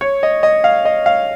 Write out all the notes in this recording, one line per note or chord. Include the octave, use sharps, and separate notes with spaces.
C#5
D#5
D#5
F5
D#5
F5